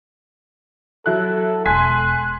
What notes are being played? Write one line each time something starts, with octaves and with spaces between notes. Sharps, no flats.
F#3 E4 A4 F#6
E1 G#5 C6 F#6 B6